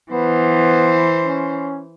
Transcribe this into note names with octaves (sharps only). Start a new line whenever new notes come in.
E3 B3 C5
C#4